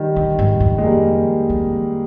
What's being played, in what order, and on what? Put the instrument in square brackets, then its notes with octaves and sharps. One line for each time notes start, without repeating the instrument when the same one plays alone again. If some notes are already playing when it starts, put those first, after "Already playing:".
Already playing: [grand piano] D#3 G3
[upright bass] D3
G#2
F2
[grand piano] G#3
G3 A#3
[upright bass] F2